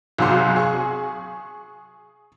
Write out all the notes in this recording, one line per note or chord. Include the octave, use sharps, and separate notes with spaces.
B1 C3 F#3 G#4 F#5 C6
G#4 C#6